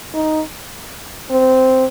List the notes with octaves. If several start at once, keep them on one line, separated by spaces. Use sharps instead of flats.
D#4
C4